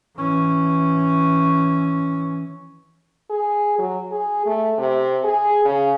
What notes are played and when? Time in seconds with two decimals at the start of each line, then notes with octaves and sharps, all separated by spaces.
0.17 E3 C#4
3.30 G#4
3.78 F#3
4.11 G#4
4.46 A3
4.78 C3
5.24 G#4
5.65 C#3